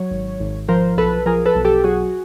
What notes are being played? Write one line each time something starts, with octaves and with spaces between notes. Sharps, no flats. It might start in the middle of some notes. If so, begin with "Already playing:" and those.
Already playing: F#3 C#5
G#1
G#1
F3 A#4 C5
B1 A4 B4
F3 G#4 A#4
A4 B4
B1
G4 A4
F#3 F#4 G#4